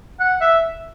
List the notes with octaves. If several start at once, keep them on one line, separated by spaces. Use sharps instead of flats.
F#5
E5